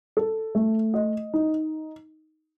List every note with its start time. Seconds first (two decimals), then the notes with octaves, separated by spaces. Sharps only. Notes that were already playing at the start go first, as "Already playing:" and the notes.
0.17 A4
0.55 A3
0.94 D#5
1.34 D#4